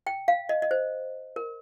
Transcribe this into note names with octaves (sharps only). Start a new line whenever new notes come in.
G5
F5
D#5
D#5
C5
A#4